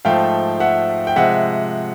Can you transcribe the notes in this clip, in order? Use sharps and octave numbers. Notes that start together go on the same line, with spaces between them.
G#2 F3 A3 F5 G5
E5 F#5
G5
C3 F3 G#3 E5 F#5